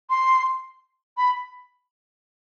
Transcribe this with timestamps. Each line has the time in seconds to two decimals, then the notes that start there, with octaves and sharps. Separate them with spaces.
0.10 C6
1.17 B5